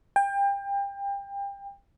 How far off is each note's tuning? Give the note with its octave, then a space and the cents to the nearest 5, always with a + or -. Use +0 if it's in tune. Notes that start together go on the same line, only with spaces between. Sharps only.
G5 +30